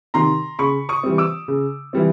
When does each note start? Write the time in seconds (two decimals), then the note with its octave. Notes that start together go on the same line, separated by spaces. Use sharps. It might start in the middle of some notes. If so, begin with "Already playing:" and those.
0.14 C3 D#3 A#5 C6
0.59 C#3 B5 C#6
0.89 C#6 D#6
1.03 E3 G3 C4
1.18 D6 E6
1.48 C#3
1.93 E3 G3 C4